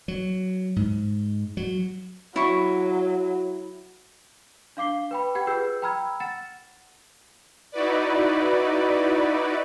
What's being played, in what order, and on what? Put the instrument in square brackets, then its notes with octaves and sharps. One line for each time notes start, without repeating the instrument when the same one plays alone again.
[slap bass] F#3
G#2
F#3
[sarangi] F#3 [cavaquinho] E4 C#6
[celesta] D4 F5 D6 C7 G7
B4 G5 B5
G4 F#5 G5 G#6
F4 G#4 B4 E6 G6 C7
G5 A#5 B5 E6 F6 G#6
F#5 A6 C#7 E7
[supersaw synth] D#4 E4 F#4 B4 D5